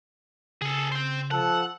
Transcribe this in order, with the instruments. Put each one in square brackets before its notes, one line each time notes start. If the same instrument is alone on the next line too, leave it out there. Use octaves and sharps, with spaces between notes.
[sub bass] C#3 [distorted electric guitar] G#4 A4
[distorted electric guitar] C5 G5
[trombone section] F3 A4 [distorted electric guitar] F#5